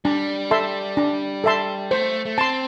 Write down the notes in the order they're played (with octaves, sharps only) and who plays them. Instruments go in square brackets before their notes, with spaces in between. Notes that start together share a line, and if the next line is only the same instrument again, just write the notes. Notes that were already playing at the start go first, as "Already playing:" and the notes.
[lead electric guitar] G3 [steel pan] D4
[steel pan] A4 E5 A5 C6
D4
A4 E5 A5 C6
[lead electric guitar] A3 [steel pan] C5
[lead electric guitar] A3
[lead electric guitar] C4 [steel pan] A5 C6